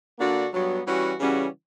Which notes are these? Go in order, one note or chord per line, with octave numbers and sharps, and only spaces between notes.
D3 A#3 D4 F#4
G2 F#3 B3
E3 G3 C#4 F#4
C#3 E3 G3 C#4 F#4